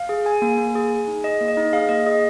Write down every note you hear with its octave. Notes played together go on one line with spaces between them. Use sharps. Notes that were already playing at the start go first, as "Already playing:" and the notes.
Already playing: F5
G#4
G#4 G#5
A#3
A#3
G#4
G#4
D#4
G#4 D#5
A#3
D#5
D#4
G#4 F5
A#3 D#5
G#4 D#5